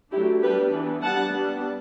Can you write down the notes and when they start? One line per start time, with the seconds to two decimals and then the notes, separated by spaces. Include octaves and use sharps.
0.12 F#3 A3 D4 E4 G4
0.42 G3 B3 D4 G4 B4
0.72 E3 B3 D4
1.02 G3 B3 D4 F#5 A5
1.32 G3 B3 D4